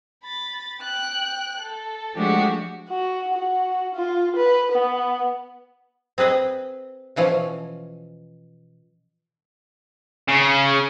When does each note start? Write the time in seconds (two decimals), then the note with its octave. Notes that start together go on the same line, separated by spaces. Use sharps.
0.24 B5 A6
0.81 G5 F#6
1.59 A4
2.15 F3 G#3 A3 D4 F#4 G4
2.89 F#4
3.33 F#4
3.95 F4
4.36 B4
4.72 B3
6.18 C4 G#4 B4 D#5
7.16 B2 E3 F3 C#4
10.28 C#3